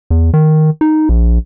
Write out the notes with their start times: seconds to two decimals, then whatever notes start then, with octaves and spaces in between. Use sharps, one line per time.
0.10 E2
0.34 D#3
0.81 D#4
1.09 A#1